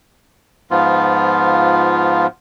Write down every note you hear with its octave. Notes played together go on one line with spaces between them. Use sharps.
G#2 F3 B3 F4